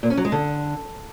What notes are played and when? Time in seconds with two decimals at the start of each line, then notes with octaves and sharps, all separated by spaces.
0.03 A#2
0.10 C#4
0.17 F#3
0.25 G#3
0.32 D3